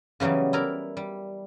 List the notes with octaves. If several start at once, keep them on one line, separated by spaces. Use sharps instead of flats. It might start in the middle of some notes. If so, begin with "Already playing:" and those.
C#3 E3 F#3 G3 B3
E4 A#4 D5
G3